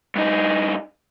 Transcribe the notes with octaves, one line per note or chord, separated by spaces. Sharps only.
G2 D#4